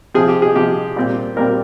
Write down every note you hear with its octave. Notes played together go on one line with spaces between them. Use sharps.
C3 F3 C4 G#4
G4
G#4
C3 F3 C4 G4
A#2 G3 C4
A#2 G3 C4 A#4